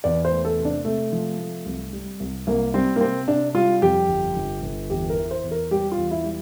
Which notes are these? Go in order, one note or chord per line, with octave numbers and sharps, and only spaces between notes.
E2 D5
C5
A3
A4
C3
D4
C3 A3
F3
A3
C2
G3
C2
C2 A#3
G3 C4
A#3
C3 C4
C3 D4
G3 F4
F2 G4
G1
G1
G1
E2 G4
A#4
E3
C5
E2
A#4
G3 G4
F4
E2
E4
G3